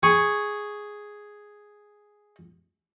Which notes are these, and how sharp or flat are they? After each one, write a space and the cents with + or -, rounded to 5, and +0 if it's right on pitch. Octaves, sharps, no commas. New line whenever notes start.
G#4 +0 C#6 +0